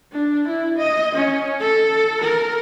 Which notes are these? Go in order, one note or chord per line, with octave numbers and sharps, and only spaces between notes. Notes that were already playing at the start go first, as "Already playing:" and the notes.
D4
E4
D#5
C#4
A4
A#4